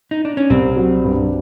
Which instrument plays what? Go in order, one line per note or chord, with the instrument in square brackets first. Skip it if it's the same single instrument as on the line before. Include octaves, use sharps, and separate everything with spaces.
[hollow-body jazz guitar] D#4
D4
C#4
[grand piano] C2 [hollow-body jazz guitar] C4
[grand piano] F#3
G2